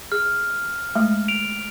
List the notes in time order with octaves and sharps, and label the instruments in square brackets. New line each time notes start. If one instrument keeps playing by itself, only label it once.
[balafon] G#4 [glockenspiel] F6
[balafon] G#3 A3
[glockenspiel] D7 F7